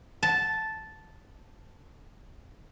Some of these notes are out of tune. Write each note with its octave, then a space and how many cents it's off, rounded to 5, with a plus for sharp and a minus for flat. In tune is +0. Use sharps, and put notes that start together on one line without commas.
A5 -5